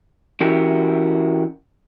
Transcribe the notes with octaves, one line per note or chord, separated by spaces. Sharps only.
E3 C#4 E4 F#4 G4 A#4